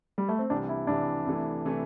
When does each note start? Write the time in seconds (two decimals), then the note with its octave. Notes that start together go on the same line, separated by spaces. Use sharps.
0.18 G3
0.29 A3
0.39 C4
0.50 C2 C3 E3 G3 D4
0.69 E4
0.87 C2 C3 E3 G3 D4
1.26 C2 C3 E3 A3
1.65 C3 E3 A3